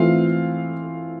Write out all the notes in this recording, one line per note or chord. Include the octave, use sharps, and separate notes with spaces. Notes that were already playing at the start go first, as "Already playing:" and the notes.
Already playing: E3 A3 C4 E4 F4 F5